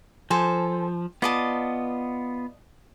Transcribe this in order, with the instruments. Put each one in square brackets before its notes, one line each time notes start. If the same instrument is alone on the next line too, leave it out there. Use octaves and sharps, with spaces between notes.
[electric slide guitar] F3 [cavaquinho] A4 C5 G#5
[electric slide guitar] B3 F4 [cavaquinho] D5 D#5 A5